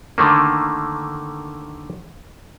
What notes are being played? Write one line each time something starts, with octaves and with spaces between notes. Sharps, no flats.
D3 D#3 A3 A#3